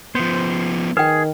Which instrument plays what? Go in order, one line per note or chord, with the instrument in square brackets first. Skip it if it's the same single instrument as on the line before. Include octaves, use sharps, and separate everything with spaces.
[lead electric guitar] F3 B3 [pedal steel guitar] C5
[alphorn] D#3 [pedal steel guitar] G#4 [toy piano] B4 G5